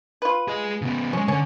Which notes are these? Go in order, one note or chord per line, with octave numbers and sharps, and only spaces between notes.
F4 B4
G#4 D#5
C#3 B3
F3 G#3 C#4
D3 C#4